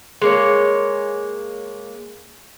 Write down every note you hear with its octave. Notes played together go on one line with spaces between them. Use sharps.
G#3 A#3 C#5